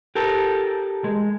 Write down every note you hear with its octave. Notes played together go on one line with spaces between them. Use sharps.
G4 A4 A#4
G#3